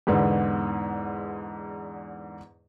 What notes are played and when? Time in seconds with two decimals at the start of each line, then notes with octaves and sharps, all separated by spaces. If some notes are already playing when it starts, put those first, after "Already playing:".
0.07 E2 G#2 D3 B3